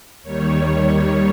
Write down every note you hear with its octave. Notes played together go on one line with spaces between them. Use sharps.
D#2 D#3 G3 C#5